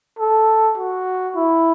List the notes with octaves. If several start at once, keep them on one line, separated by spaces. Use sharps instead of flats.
A4
F#4
E4